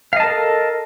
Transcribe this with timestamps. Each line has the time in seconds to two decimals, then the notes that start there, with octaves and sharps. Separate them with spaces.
0.13 F5
0.16 D#5
0.20 A5
0.23 A#4
0.27 A4